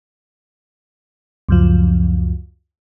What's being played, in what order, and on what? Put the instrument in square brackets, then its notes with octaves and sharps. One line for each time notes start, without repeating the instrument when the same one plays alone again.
[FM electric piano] C#2 F#2 F3